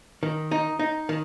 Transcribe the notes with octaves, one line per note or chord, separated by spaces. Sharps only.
D#3
D#4
D#4
D#3